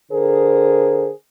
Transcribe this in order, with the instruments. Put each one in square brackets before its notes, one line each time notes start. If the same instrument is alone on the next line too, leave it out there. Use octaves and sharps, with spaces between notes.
[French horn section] D3 G#4 A#4 C5